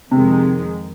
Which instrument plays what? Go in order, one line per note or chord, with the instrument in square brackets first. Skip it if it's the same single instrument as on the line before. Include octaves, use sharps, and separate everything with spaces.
[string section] F2 D#3 G#3 [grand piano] C3